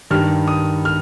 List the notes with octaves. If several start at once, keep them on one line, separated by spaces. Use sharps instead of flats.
G2 D#3 G3 F6
D#6
F6